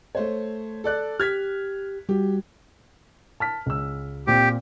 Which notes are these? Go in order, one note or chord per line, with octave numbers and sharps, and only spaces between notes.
A3 C5 C#5
A4 D5 F#6
G4 F6 G#6 B6
G3 F#4 G4
A5 F6 B6
C#2 E6
A#2 C4 G4